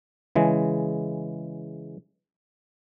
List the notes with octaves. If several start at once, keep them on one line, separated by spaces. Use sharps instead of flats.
C#3 E3 G#3